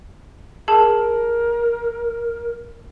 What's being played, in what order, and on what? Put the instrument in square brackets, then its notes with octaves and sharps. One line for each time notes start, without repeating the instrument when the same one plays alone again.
[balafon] G#4 A5 [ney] A#4